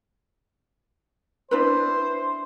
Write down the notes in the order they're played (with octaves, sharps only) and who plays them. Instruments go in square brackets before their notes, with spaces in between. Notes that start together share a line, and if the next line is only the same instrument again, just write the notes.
[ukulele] D4 E4 B4 [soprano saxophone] C5